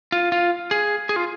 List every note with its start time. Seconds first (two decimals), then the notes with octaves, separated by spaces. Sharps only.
0.12 F4
0.32 F4
0.71 G#4
1.09 G#4
1.16 F4